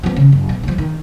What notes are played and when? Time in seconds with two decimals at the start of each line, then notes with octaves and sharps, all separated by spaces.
0.03 F3 B3
0.16 C#3
0.32 F#1
0.49 B2
0.63 C#3 F3
0.78 D#3